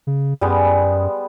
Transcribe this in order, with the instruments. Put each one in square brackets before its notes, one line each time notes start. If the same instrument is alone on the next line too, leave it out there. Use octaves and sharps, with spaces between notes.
[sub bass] C#3
[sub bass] F#2 [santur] G3 G#3 B3